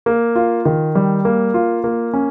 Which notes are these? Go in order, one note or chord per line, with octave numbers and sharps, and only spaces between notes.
A#3
F4
D#3
G3
A#3
F4
A#3
C#4